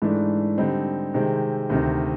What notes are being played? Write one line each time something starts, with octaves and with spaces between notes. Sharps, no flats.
G#2 E3 A3 D4
D3 G3 C4 D#4
C3 D#3 G#3 C4
D2 C3 D#3